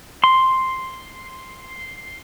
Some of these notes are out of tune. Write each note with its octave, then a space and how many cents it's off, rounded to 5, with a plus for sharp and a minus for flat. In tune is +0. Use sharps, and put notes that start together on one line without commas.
C6 +0